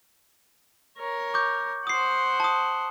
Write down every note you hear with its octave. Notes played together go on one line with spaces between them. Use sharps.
A#4 C#5
C#6 D6 G6
C5 F#5 D#6 C7
A5 D#6